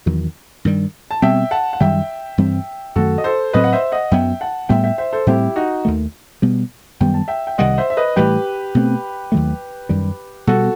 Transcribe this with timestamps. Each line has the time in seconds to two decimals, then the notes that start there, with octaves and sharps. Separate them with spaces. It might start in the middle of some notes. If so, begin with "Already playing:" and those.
0.06 E2 D#3 F#3
0.65 G2 D#3 G3
1.11 A5
1.22 B2 G3 C4 E5 G5
1.51 F#5 A5
1.73 F#5
1.80 F#2 D#3 G3 E5 G5
2.38 G2 E3 G3 C4
2.96 F#2 D#3 A3 F#4 A4
3.18 D#5
3.24 A4 C5
3.53 A2 F#3 C4 B4 D#5
3.64 F#5
3.73 C5 E5
3.92 D#5 F#5
4.11 F#2 F#3 B3 E5 G5
4.41 F#5 A5
4.69 A2 G3 B3 E5 G5
4.84 E5 G5
4.98 C5 E5
5.13 A4 C5
5.27 A2 G3 C4 E4 G4
5.56 D#4 F#4
5.85 D#2 D#3 A3
6.42 B2 G3 B3
7.00 F#2 D#3 G3 B3 G5
7.14 A5
7.28 E5 G5
7.47 G5
7.58 C2 C3 D#3 G3 D#5 F#5
7.78 C5 E5
7.90 E5
7.97 B4 D#5
8.16 A2 E3 G3 G4 B4
8.75 B2 A3 C4
9.32 D#2 D#3 F#3 A3
9.89 F#2 D#3 G3
10.47 B2 G3 B3 F#4 A4